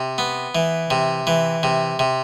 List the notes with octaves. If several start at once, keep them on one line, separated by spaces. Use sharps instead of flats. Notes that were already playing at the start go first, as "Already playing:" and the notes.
Already playing: C3
B3
E3
C3
E3
C3
C3